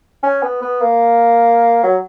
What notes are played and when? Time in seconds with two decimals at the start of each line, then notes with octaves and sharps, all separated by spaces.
0.23 C#4
0.43 B3
0.62 B3
0.81 A#3
1.83 F#3